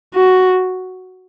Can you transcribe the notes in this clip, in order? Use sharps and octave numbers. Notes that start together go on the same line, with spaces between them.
F#4